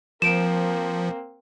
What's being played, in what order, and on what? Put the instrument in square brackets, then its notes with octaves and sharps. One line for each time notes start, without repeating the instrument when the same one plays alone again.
[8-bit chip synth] F3 [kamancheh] A#3 C4 [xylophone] D7 E7